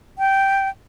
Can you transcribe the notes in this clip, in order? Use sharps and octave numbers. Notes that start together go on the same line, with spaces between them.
G5